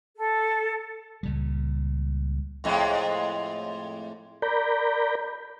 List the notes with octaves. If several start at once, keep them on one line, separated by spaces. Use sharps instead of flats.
A4
C#2 A#2 G3
F2 A2 G#3
A#4 D5 A#5 B5 G6